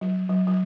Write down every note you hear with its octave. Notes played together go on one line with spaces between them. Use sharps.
F#3
F#3
F#3